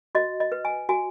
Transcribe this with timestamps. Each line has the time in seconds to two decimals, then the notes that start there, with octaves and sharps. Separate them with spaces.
0.15 F#4 D#5
0.40 D#5
0.52 B4
0.65 G#5
0.89 F#4 G#5